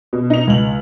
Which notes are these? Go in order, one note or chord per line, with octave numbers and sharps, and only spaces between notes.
B2
D#4 F7
C#2 F#7